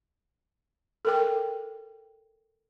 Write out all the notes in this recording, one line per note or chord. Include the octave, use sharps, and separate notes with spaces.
A4 A#4 G5